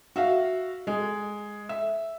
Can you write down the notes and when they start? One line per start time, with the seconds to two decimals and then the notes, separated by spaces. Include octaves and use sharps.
0.16 F#4 E5 F5
0.87 G#3
1.69 E5